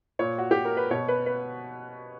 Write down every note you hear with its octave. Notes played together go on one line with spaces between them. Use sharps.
A#2 C#5
F#4
G4
A#4
B4
B2 C#5
B4
B4